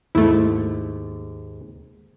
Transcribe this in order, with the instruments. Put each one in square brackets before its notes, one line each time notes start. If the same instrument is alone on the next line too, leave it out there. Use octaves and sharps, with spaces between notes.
[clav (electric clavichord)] D#2 G#2 [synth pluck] A3 E4